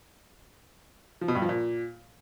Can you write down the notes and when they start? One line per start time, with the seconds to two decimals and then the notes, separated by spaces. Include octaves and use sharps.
1.21 F3
1.28 B2
1.35 G2
1.42 F3
1.49 A#2